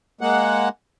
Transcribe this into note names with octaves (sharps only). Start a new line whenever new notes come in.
G#3 A#3 F#5